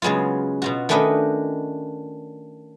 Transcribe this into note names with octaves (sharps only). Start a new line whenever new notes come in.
C#3 F#3 G#3 B3 F4
B2 F4 F#4
D#3 A3 C#4 D4 B4 D#5